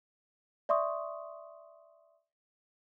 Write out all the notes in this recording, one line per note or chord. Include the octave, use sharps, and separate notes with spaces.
D5 E5 C6 C#6 D#6